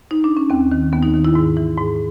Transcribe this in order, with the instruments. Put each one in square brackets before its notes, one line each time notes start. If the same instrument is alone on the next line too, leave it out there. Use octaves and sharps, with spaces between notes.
[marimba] D#4
D4
C#4
D#2 C4
D#3
D#2 B3
D#4
D#3
E4
G#2
E3
G#2